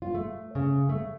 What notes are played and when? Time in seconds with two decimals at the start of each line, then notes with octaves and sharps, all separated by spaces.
0.02 F4
0.15 A3
0.55 C#3
0.89 A3